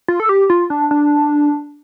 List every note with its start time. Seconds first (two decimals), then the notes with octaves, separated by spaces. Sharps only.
0.08 F4
0.20 A4
0.29 G4
0.50 F4
0.70 D4
0.91 D4